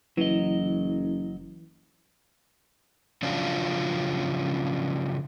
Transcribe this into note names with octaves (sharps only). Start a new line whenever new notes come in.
F#1 E3 F#3 D#5
C#3 F3 F#3 C#4 D4 F4